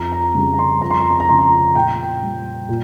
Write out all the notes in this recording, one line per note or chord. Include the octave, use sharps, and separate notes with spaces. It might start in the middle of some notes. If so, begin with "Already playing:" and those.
Already playing: F2 A#5
A#5
C#3 G3
A#5
C6
F2 A#5
C6
A#5
C6
A#5
C#3 F3 C6
A#5
A#2 G5
G3
A#2